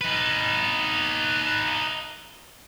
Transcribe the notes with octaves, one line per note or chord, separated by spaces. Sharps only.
D#4 B4